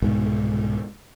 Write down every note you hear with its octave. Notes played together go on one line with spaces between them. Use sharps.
C2 G#2 B2 G#3